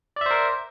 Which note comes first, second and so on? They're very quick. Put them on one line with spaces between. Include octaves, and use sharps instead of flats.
D5 E5 C5 A#4